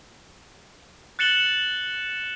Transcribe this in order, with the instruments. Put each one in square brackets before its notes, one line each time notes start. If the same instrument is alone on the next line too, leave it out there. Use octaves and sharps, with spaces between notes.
[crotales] F#6 A6 C#7 E7 F#7 G7